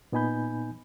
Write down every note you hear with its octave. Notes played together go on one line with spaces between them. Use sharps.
A#2 B3 D#4 G#5 B5 G6